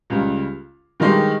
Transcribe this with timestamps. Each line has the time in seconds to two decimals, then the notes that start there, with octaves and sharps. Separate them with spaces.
0.10 C#2 C#3 G3
1.00 G2 D#3 G#3 D#4 G4